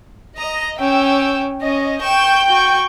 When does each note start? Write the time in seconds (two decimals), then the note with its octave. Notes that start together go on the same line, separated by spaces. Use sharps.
0.38 D#5 A#5
0.80 C#4 G5 E6
1.62 C#4 D#5
2.02 G5 C#6 G6 E7
2.49 F#4 C#6